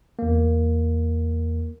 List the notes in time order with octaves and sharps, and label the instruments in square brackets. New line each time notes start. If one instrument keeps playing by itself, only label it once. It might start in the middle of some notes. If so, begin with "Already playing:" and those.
[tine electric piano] E2 A#3